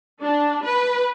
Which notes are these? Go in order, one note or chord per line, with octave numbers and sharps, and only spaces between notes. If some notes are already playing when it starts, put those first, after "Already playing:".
D4
B4